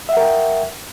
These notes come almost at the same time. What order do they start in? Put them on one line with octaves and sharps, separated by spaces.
E5 F#5 A#4 G5